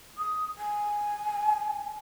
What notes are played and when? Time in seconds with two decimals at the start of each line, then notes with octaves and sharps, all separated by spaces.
0.18 D#6
0.58 G#5